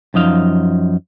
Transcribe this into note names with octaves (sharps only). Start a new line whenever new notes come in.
F#2 F3 D#4 F5